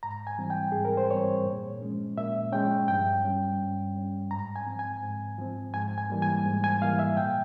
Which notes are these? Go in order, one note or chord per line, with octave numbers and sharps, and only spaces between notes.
G#2 A#5
G#5
E3 G3 C4
G5
G#2 G#4
A#4
C5
E3 G3 C4 C#5
A#2
F3 G#3 C#4
A#2 E5
F3 G#3 C#4 G5
G2 G5
G3 C#4
G2
G3 C#4
G#2 A#5
G#5
F3 C4
G#5
G#2
F3 C4
G#2 G#5
G#5
E3 G3 A#3
G#5
G#2
G#5
E3 G3 A#3 F5
E5
A#2 G5